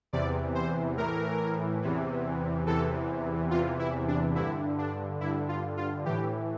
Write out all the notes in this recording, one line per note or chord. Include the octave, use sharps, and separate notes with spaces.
E2 C3 E3 D5
C5
A2 E3 A#4
E2 C3 E3
E2 C3 E3 A4
E2 C3 E3 F4
E4
D4
G2 D3 E4
D4
G2 D3 E4
F4
F4
A2 E3 G4